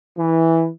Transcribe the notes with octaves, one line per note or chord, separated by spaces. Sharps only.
E3